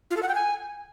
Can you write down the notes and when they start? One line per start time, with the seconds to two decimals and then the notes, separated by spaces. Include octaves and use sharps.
0.11 F4
0.17 A4
0.23 F#5
0.29 G5
0.35 G#5